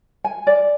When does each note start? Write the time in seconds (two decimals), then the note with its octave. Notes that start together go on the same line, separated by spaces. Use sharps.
0.24 G#5
0.47 D5